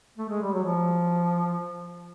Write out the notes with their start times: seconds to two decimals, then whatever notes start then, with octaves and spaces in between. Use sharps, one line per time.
0.18 A3
0.29 G#3
0.42 G3
0.52 F#3
0.64 F3